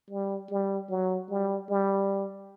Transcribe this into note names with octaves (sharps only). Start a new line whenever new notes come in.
G3
G3
F#3
G3
G3